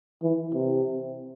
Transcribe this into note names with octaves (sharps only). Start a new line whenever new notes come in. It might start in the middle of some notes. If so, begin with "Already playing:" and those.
E3
C3